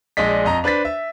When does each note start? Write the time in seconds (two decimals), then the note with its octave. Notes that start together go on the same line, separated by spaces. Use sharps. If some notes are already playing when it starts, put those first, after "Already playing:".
0.17 A#1 G#3 D5 D#5 B6
0.45 F2 D#5 A#5
0.64 D4 B4 C5 A6 B6
0.85 E5